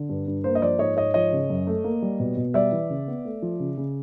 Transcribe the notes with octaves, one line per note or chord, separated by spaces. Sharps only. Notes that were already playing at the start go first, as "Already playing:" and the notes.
Already playing: D3
G2
G2
A#3 C5
D#5
F3 C5 D5
G#2 C#5 D#5
G#2 C#5 D#5
F3 C#5 D#5
C#3
F#2
A3
A#3
G3
B2
B2
G3 D5 E5
E3
C#3
B3
A3
F3
C#3
C#3